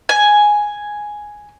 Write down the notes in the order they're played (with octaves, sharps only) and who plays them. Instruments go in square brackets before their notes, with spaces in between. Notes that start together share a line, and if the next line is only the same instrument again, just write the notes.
[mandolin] G#5